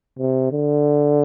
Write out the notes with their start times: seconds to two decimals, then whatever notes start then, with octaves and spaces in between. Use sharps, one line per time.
0.19 C3
0.51 D3